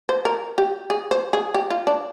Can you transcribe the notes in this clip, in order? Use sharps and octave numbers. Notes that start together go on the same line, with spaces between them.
C5
A#4
G4
G#4
C5
G#4
G4
F4
D4